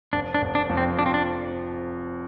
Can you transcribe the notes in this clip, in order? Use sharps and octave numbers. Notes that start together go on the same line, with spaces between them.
F1 D4
D4
F1
D4
F2
C4
F3 D4
C4
D4